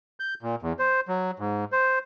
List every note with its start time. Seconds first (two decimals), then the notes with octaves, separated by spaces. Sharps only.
0.20 G6
0.42 A#2
0.62 E2
0.79 C5
1.08 F#3
1.39 G#2
1.72 C5